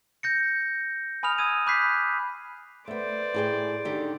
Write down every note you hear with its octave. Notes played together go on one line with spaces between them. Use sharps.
G6 A#6 C#7
G#5 B5 D#6 F6 F7
D#6 E6 G#6 D#7
B5 D6 F#6 G6 B6 C7
A3 B3 C5 D5
A2 G#4 G5
D3 D#3 G4